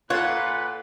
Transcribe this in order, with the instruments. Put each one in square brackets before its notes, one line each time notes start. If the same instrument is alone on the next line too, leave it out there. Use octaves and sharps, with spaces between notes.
[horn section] A#2 B4 [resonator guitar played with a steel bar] F4 [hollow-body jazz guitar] A4 C#5 [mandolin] F#5